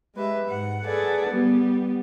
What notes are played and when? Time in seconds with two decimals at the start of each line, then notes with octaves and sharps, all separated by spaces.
0.15 G#3 G4 B4 E5
0.48 G#2 F#5
0.85 G#4 A4 B4 D5 F#5
1.29 G3 B3 G4